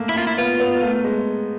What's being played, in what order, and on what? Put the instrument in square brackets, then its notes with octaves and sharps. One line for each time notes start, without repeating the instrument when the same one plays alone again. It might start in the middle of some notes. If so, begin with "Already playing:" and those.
Already playing: [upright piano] A3 A#3
[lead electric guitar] E4
[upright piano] A#3 [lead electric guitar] F4
[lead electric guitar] E4
[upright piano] B3 [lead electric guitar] F4
[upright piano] B3
A3
G#3